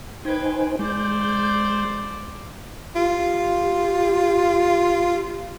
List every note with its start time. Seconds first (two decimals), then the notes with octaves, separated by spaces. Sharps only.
0.25 D#4 B4 C5 G5 G#5
0.79 G#3 C5 D5 G6
2.96 F4 G4